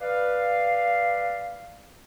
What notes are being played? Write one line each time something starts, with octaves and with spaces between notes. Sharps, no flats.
B4 D5 F5